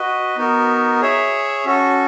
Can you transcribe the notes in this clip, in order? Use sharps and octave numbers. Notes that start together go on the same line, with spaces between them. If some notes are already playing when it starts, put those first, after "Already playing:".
Already playing: F#4 B4 D#5
B3 D#4 F#4 A#4
G#4 C#5 E5
C#4 F#4 A4